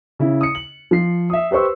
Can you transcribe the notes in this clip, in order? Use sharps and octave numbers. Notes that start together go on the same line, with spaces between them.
C#3 E4
D#6 C#7
F#7
F3 C7
E5 D#6
G4 B4 C5 C#6 E6